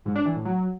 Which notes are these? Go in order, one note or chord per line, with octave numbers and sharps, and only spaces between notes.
G#2
D4
E3
A2
F#3